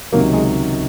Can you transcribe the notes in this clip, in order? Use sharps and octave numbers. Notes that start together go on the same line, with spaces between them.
C#2 C3 D#3 F#3 A#3
G#3